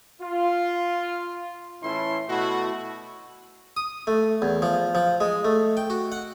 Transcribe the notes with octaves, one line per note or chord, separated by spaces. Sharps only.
F4
A2 E3 C#4 E4 A4 C6
B2 A3 E4 F#4
D#6
A3
E2
F3
F3
G#3
A3
G5
F#4
F#5